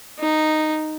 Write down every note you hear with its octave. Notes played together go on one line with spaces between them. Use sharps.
D#4